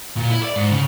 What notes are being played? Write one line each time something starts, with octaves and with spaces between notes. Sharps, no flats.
A#2
E4
D5
G#2
C#3